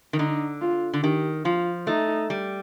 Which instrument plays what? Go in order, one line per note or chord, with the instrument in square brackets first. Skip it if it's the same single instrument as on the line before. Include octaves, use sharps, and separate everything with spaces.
[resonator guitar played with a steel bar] D#3
[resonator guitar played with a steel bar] D3 [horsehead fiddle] D#4
[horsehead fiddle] F4
[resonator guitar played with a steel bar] D3
[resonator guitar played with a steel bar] D#3 [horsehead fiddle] G4
[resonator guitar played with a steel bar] F3 [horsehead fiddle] F4
[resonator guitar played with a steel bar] A3 [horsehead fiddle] D#4
[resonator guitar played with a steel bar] G3